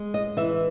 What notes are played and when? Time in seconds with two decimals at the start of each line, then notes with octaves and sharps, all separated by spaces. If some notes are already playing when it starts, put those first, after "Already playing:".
Already playing: G#3
0.14 D#5
0.37 E3 E5